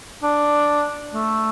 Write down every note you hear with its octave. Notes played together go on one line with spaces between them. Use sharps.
D4
A3